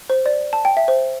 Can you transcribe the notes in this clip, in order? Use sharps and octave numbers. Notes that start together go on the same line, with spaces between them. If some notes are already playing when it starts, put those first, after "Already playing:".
C5
D5
A5
G5
E5
C5